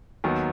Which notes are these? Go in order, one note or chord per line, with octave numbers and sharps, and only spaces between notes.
D#2 D#3 F#3 B3